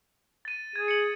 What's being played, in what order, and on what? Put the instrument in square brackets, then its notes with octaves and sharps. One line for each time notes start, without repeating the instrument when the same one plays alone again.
[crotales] A6 D#7
[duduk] G#4 [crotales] G#6
[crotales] C#7 F#7